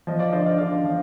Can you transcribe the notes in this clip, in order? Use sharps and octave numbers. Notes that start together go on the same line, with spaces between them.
F3 D#5
D5 F5
D3 C5 D#5
D5 F5
D3 D5 F5
F3